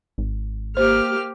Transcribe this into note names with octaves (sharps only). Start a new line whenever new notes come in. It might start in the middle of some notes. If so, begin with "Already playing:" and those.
G#1
A#3 G4 C5 F6